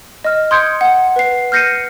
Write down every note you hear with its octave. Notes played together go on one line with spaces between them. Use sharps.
D#5 F6
C6 D#6 G6 G#6 C#7 D7
F#5
B4 C7
F6 G6 A#6 C7 C#7 D#7